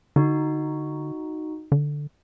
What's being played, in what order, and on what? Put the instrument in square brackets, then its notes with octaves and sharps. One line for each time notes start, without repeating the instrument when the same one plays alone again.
[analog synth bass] D3 [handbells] D#4 F#4
[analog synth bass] D3